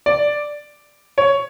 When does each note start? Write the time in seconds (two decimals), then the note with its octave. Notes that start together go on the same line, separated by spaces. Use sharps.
0.06 D5
1.18 C#5